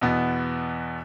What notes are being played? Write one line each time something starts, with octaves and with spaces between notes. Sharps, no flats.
E2 B2 B3